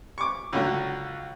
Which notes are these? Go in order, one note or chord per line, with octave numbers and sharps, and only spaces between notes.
C#6 D6
C#2 D3 F#3